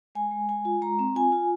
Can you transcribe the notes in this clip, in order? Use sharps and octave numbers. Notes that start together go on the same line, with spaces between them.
G#3 G#5
G#3
G#3 G#5
F4
G#3 A#5
C4
F4 G#5
F4